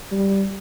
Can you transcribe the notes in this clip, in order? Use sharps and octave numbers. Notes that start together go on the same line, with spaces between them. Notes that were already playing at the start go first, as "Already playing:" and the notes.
G3